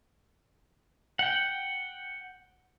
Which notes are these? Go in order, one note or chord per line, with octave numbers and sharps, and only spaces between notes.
F#5 G5